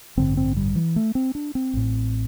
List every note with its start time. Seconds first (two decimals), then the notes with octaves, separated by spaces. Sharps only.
0.17 A1 G2 D3 C4
0.37 C4
0.56 G3
0.75 E3
0.96 A3
1.15 C4
1.35 D4
1.55 C4
1.73 A1 A2